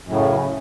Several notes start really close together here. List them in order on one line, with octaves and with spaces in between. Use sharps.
F#2 A2 C#3